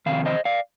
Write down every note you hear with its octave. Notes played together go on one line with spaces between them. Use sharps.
F2 C3 D#3 F5
C5 D#5
D5 F5